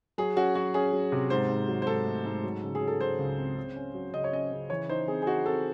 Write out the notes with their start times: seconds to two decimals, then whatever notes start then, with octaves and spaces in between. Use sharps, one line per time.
0.18 F#3 G#4
0.36 C#4 F#4
0.55 F#3 F#4
0.74 C#4 G#4
0.93 F#3
1.12 C3
1.30 G#2 C5
1.49 G#2
1.68 F#3
1.82 C5
1.87 G#2 A4
2.07 A3
2.25 G#2
2.44 F#3
2.63 C#3
2.75 G#4
2.81 F#3
2.88 A4
3.01 F#3 C5
3.19 C#2
3.38 C4
3.57 C#3
3.76 C#4
3.95 F#3
4.13 C#3 D#5
4.24 C#5
4.32 C#4 D#5
4.51 C#3
4.70 E3 C#5
4.89 D#4 C5
5.08 C4 G#4
5.22 G#4
5.27 D#4 F#4
5.45 C4 A4